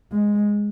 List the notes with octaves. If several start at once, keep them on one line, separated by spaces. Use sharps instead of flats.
G#3